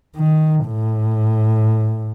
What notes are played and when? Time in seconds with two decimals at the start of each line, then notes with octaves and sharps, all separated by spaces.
0.17 D#3
0.67 A2